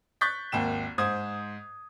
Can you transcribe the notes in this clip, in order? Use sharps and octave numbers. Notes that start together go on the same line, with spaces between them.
C#6 F#6 G6 A6 B6
G#1 D#2 G5 E7
G#2 C5 D#6 G#6